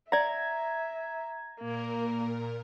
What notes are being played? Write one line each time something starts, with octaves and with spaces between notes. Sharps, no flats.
D5 E5 F#5 A#5 G#6
A#2 A#3 A#4